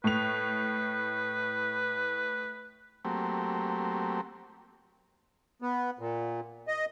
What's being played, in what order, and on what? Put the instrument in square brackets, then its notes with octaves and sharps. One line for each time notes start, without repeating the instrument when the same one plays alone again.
[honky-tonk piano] A2 F7 [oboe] B4
[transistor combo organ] F#3 A3 A#3 C4 G4
[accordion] B3
A#2
D#5